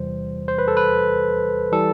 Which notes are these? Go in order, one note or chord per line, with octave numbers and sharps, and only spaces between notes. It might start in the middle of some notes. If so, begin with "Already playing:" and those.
Already playing: E2 C3 E3 G3 C5
C5
B4
A4
B4
E3 G3 A4